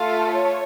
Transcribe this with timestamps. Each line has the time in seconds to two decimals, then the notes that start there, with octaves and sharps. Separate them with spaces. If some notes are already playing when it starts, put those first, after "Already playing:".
Already playing: A3 F4 A4 F5
0.31 C#5